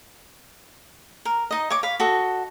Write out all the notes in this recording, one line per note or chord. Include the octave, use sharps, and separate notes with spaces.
A#4
D#4 D#5
C#5 D6
F5 B5
F#4 A4 D#5